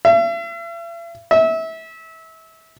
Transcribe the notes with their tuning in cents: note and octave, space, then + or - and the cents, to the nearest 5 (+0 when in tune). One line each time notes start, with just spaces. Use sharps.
E5 +45
E5 -25